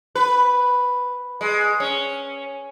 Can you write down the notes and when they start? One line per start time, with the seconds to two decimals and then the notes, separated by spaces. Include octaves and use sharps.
0.15 B4
1.41 G#3
1.80 C#4